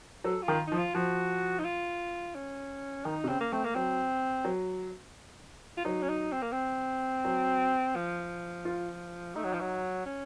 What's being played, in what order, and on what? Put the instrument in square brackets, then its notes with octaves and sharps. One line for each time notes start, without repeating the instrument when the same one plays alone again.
[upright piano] F#3 [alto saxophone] A4
[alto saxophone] F4
[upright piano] D#3
[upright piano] F3 [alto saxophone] D#4
[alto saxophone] F4
[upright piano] F3 [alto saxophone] F#4
[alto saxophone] D#4
F4
C#4
[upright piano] D#3 [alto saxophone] D#4
[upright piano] C3
[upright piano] C#3 [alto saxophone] C4
[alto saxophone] A#3
[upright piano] A3 [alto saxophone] C4
[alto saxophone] A#3
[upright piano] F#3 [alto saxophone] C4
[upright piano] F#3
[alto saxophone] F4
[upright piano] F#3 [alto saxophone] D#4
[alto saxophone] C#4
D#4
C4
A#3
C4
[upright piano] F#3
[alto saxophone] F3
[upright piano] F4
[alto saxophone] A3 [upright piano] D#4
[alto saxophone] F#3
F3
F#3
C#4